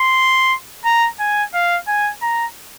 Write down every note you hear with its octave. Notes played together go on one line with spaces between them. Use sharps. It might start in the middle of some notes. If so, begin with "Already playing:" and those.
Already playing: C6
A#5
G#5
F5
G#5
A#5